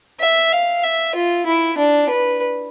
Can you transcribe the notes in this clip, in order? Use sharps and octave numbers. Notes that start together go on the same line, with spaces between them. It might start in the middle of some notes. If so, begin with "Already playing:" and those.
E5
F5
E5
F4
E4
D4
B4